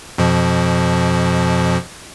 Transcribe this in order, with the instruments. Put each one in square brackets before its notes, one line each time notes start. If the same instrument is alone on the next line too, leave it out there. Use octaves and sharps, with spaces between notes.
[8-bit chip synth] F2 B2 F3